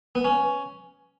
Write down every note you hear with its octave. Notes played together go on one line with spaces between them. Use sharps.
B3
C#4